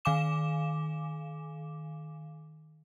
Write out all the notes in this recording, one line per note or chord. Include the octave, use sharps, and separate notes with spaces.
D#3 F5 G#5 D6 E7